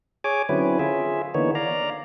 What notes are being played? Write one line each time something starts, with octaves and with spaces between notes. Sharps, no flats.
G#4 C#5 G#5 D6
D3 F#3 C4 C#4 E4 B4
F4 G#4 E5
D3 E3 A#3 B3 D#4 C#5
D5 F5 A#5